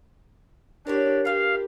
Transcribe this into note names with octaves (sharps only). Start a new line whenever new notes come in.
C#4 D4 E4 G4 A#4 C#5
D4 F4 G4 B4 F5